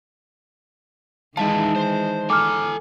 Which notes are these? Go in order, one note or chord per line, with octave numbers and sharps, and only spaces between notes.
D#3 E3 G#3 D#4 E5 F5 A5
C5
A4 G#5 A#5 D6 F6